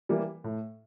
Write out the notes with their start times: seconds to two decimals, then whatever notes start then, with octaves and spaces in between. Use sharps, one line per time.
0.09 E3 G3 A#3
0.44 A2